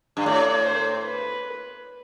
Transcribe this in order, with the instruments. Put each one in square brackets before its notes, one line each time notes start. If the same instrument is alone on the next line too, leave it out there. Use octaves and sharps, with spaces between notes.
[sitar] G2
[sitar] A2 [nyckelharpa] D5
[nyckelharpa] C5
B4